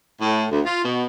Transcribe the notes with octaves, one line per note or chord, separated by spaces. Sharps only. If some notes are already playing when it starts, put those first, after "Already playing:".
A2
D2
F4
B2